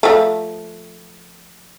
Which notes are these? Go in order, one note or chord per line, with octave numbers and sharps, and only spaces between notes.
F3 A3